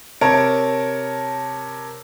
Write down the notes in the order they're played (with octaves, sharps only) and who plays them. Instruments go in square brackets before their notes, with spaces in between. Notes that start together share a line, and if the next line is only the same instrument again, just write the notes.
[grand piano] C3 A#4 C#5 A5 D7